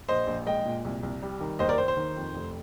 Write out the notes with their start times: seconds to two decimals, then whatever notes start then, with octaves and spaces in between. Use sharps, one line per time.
0.08 A#1 C5 D#5
0.27 A#1
0.47 G#3 D#5 G5
0.66 A#2
0.85 C2
1.03 C2
1.22 G3
1.41 D#3
1.59 D#2 C5 D#5
1.69 A#4 D5
1.78 D#2 C5
1.88 C5
1.97 D#3
2.17 F2
2.35 F1